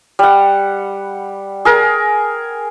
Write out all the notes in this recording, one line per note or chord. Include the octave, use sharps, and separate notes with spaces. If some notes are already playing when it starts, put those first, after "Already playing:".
G3 F#5
G#4 A#4